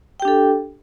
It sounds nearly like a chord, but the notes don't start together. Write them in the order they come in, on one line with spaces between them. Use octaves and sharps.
G5 G4 D4 A4